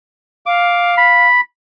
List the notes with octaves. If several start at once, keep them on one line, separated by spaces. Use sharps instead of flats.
F5 D6
B5